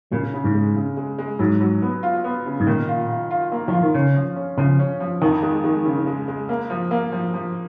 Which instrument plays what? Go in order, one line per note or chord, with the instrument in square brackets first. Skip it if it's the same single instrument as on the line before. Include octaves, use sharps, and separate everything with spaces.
[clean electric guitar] A#2 [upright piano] C#3
[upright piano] C#3
[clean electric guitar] G#2
[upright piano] G#3
C#3
G#3
G#3
[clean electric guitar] G#2 [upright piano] F#3
[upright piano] F#3
B3
F4
B3
C#3
[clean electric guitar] G#2
[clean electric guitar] A#2 [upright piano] D#3
[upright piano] F4
F4
F4
A#3
[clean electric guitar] F3 [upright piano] F4
[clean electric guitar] D#3
[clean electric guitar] C#3 [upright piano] C#4
[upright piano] F3
C#4
[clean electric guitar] C#3 [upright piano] F3
[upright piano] C#4
F3
[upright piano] F2 [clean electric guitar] D#3
[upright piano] G#3
G#3
C#3
G#3
G#3
A#3
F3
A#3
F3
F3